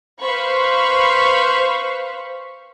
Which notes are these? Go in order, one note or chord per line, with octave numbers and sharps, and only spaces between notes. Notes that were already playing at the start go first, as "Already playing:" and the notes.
B4 C5 F5 B5 C#6